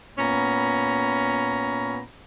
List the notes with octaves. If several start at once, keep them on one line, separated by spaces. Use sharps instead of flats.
A#2 B3 C#4 A#5 B5